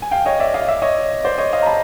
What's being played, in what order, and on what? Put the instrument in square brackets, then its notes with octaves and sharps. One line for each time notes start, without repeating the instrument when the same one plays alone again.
[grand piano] G#5
F5 G5
C#5 D#5
D5 E5
D#5 F5
D5 E5
C#5 D#5
C5 D5
C#5 D#5
D#5 F5
A#5
A5 B5